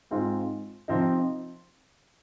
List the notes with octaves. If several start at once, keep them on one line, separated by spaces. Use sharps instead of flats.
G#2 G#3 C4 F4
C3 F3 C4 D#4